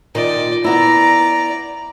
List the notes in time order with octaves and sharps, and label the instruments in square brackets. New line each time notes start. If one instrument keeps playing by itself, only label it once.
[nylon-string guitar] A#2 D#3 [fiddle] D5 D#5
[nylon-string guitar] B3 E4 [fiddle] D5 A#5